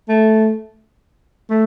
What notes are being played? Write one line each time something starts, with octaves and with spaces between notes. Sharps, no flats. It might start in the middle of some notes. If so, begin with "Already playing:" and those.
A3
A3